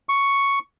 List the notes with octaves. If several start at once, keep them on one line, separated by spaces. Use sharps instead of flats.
C#6